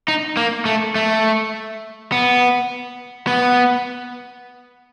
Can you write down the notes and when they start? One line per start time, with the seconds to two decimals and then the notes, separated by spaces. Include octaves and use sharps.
0.08 D#4
0.37 A#3
0.66 A3
0.96 A3
2.12 B3
3.27 B3